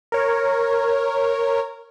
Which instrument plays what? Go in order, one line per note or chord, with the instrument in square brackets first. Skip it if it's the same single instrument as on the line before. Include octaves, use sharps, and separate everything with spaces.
[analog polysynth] A#4 C#5